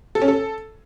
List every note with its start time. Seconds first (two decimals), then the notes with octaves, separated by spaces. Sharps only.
0.15 A4
0.22 C#4
0.28 A4